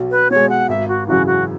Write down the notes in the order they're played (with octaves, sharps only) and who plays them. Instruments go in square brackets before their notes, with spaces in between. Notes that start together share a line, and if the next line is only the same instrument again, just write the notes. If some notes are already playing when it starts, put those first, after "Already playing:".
Already playing: [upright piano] B1 B2
[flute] B4
[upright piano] B2 G#3 [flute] C#5
[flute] F#5
[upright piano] G#1 [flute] E5
[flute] F#4
[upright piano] F#2 C#3 E3 [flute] F#4
[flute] F#4